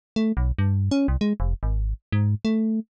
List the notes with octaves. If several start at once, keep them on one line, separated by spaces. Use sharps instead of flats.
A3
B1
G2
C#4
C2
G#3
F1
G#1
G#2
A3